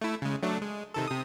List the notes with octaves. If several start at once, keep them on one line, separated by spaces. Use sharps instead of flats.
A3 E4
C#3 G#3
F#3 A3 D4
G#3
C3 D#3 A4
C3 D#6